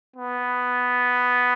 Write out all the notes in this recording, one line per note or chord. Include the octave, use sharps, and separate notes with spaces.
B3